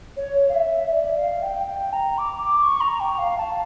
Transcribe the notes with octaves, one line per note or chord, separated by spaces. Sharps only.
C#5
F5
E5
D5
E5
F5
G5
G5
A#5
D6
D6
C#6
A#5
G5
F5
A5